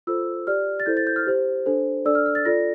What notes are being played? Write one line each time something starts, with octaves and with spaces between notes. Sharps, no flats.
F4 A4 C5 E6
G4 D5 F6
A6
E4 A4 C5 G6
A6
G6
F6
G4 C5
D4 A4 C5
D4 A4 D5 E6
F6
F6
A6
F4 A4 D5 A#6